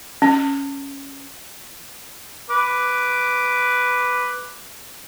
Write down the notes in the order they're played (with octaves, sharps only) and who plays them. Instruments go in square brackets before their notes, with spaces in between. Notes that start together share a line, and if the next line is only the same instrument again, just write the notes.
[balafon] C#4
[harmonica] B4 D6